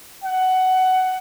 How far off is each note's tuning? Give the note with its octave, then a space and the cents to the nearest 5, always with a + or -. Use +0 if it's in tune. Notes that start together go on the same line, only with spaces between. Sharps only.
F#5 +15